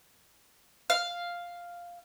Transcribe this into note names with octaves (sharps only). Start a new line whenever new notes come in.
F5